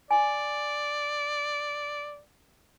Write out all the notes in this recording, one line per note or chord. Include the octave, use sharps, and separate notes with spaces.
D5 G#5